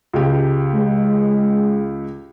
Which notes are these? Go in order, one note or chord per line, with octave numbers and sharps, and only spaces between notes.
C#2 G4
G#3